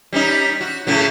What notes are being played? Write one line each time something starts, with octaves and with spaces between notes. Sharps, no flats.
G3 C#4 D#4
F#4
A2 C#3 F#3